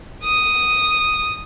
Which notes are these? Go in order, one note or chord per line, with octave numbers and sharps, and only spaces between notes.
D#6